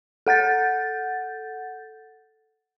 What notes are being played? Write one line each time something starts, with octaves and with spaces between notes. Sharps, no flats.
A4 F#5 G6 A6